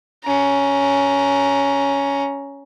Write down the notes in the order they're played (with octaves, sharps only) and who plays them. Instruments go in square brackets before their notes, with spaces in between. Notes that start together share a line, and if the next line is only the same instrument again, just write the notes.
[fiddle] C#4 A#5